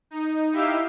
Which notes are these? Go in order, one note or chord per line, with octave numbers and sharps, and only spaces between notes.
D#4
D#4 E4 G4 E5 F5 G5